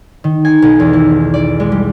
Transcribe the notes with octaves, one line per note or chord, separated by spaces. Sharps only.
D#3
G#5
B1
E2
E4
D5
G#3
G3